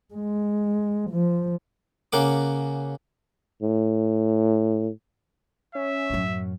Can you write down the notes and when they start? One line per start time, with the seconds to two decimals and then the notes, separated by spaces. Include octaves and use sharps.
0.14 G#3
1.10 F3
2.12 C#3 A#3 F#5 D6
3.62 A2
5.75 C#4 E5
6.10 F#2 A2